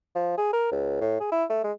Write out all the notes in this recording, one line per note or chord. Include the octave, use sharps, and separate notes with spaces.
F3
G#4
A#4
C#2
A2
G#4
E4
A3
G#3